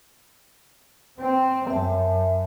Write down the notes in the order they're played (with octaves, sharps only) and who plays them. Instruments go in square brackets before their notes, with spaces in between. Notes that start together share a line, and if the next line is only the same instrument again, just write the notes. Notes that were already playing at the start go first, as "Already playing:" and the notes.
[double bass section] C4
[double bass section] F#2 [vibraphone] E5 A5